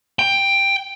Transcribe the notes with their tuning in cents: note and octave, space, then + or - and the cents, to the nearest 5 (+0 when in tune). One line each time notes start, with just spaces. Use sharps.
G5 +10